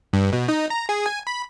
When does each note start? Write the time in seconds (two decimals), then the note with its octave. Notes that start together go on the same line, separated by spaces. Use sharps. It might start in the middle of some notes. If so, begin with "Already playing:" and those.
0.13 G2
0.33 B2
0.48 D#4
0.70 A#5
0.89 G#4
1.06 G#5
1.27 B5